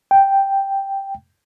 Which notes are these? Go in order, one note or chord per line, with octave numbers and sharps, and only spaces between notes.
G5